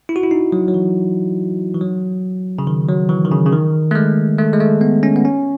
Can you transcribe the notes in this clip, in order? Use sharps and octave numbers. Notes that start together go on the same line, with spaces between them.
E4
F#4
E4
D#4
F#3
F#3
E3
E3
F#3
C#3
D#3
F#3
E3
D#3
C#3
C#3
D#3
A3
G#3
A3
G#3
A3
B3
C#4
B3
C#4